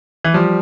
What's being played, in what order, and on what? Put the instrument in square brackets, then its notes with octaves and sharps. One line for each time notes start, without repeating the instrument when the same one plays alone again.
[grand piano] E3
[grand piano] F3 [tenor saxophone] G3